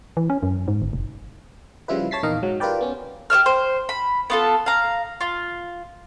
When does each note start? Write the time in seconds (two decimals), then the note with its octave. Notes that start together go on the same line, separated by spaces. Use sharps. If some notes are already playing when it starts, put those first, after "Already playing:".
0.17 E3
0.30 C#4
0.43 F#2
0.68 G#2
0.82 G1
0.93 F1
1.88 C#3 F3 G3 E4 F4 B4
2.11 C#5 A5 A6 B6 C7
2.23 A#1 E2 D#3 D#4 D#5 F5
2.43 G#2 F#3
2.60 F4 G4 A#4 B4 D5 G5
2.81 B3 C#4
3.30 G4 C#5 E5 F6
3.46 C5
3.89 B5
4.30 B3 F4 A4
4.66 F5 A#5
5.21 F4